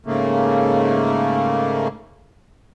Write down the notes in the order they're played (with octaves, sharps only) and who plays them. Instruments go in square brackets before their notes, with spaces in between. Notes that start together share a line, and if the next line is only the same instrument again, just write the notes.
[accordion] G#2 C#3 A3 A#3